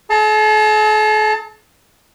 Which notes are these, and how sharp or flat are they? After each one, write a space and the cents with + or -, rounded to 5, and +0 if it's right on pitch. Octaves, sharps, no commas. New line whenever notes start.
A4 -45 A5 +30